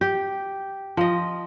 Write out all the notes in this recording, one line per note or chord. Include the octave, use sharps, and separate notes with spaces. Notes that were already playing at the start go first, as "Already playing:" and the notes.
G4
F3 D#5